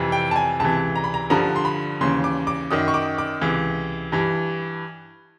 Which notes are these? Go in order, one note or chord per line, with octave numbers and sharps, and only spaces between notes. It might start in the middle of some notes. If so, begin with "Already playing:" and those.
Already playing: F2 C3 E3
G5
A5
G#5
C#2 C3 E3 A5
A#5
B5
A#5
G2 D3 F3 A#5
C6
B5
D#2 C#3 E3 C6
D6
D6
F#2 D#3 D#6
C#6
D6
D6
C#2 C3 E3
G2 E3